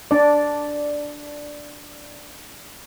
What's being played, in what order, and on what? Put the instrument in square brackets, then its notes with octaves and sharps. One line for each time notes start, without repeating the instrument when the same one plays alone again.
[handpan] D4 D5